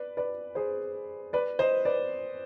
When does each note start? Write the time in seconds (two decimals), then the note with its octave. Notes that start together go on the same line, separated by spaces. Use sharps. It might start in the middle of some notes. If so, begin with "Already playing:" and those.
Already playing: B4 D5
0.17 B4 D5
0.55 G#4 C5
1.33 B4 D5
1.59 C5 D#5
1.85 B4 D5